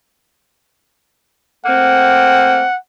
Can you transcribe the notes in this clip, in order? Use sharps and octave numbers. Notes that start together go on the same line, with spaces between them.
A3 A#3 C4 F#5